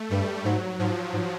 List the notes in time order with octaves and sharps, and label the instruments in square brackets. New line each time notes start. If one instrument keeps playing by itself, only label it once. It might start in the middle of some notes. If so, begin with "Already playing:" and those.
Already playing: [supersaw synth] A3
[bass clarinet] G2 [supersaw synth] G3
[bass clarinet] G#2 [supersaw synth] F#3
[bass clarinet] G#2 [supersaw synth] F3
[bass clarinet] G#2